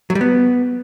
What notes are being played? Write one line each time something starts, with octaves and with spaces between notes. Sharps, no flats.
F#3
G3
B3